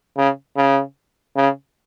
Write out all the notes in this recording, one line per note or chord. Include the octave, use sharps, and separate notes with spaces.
C#3
C#3
C#3